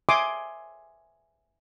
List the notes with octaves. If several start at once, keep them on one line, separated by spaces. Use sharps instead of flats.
E5 G#5 C6 D6 D#6